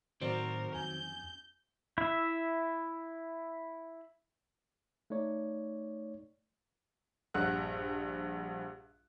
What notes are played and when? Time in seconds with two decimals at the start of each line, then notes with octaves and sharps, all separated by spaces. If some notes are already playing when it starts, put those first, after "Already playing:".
0.21 A2 D#3 F#3 C4 F#4 A#4 C5 D5
0.75 F2 G#5 G6
1.98 E4 E5
5.10 A3 D#4 C#5 D5
7.34 A#1 G2 F#5 F#6